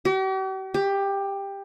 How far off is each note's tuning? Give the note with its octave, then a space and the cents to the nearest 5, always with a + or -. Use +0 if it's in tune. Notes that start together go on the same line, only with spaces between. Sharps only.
G4 -45
G4 +15